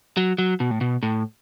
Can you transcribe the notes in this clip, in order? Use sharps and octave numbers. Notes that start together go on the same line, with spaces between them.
F#3
F#3
B2
A2
B2
A2